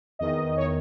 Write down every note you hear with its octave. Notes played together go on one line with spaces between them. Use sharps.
E2 D#3 D#5
C#5